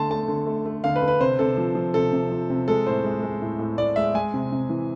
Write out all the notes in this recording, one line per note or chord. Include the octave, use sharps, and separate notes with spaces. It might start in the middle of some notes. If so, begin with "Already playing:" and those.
Already playing: D3 A3 A5 C6
A3 A5
D3
A3
A3
D3 F5
B4
D3
B4
C3 C5
C3 A4
F3
F3
C3 A4
C3
F3
C3
G#3 A4
A2 C5
G#3
G#3
A2
A2
A2 D5
G#3 E5
G#3 G#5
C3
C3
E3